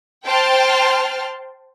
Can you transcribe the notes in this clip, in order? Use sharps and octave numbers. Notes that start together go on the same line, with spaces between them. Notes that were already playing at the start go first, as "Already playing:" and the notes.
C5 G5 A5 C6 F6